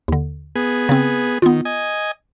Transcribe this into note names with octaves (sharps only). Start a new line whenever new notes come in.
D#2 D3
B3 G#4
C#3 C4
D#3 B3 F4
D#5 G#5